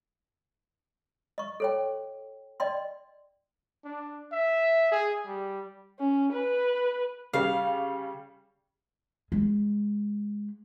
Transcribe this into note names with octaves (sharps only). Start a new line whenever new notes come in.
D#5 C#6
A4 C#5 G5
D5 D#5 G5 C6
D4
E5
G#4
G3
C#4
B4
C#3 G3 F5
G#3